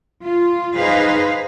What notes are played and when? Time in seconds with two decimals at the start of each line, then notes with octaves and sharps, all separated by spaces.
0.23 F4
0.75 D#4 G#4 B4 C5 D#5 F5